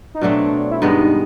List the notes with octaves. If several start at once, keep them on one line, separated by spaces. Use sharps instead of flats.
D#4
B2 F#3 A3 C4 D4
E4
G2 D#3 G#3 B3 D#4